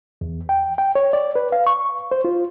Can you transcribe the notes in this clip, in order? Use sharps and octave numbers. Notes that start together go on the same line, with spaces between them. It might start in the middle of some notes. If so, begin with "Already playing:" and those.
E2
G5
G5
C#5
D5
B4
F5
C#6
C5
F4